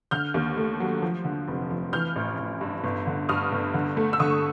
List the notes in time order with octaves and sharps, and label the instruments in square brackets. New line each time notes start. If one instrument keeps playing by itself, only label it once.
[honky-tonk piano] D3 F6 G6
D#2
A3
F#3
F3
D3
F1
F3
E3 F6 G6
A1
A1
G2
G1
D3
G2 D#6 F6
G1
D3
A3
E6
D3 C#6 D#6